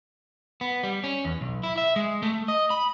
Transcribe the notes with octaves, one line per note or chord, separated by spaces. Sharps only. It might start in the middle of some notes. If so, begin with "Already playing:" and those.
B3
G3
C#4
E2
B1
E4
E5
G#3
A3
D#5
B5